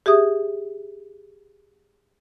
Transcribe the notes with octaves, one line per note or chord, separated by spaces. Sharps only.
G4 G#4 E5 D#6